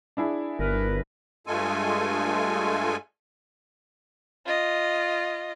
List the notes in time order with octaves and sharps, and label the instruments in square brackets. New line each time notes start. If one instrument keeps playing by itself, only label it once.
[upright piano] D4 E4 G#4
[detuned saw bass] G1 [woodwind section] A#4 B4
[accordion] G2 G#3 A3 F4 A4 G#5
[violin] F4 D#5